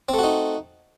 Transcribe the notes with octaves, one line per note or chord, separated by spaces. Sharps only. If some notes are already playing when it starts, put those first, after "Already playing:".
A3 C4 D#4 F#4